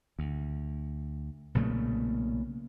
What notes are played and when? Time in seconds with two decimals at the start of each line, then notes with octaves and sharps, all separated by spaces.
0.19 D2
1.55 B1 A#2 C#3 A3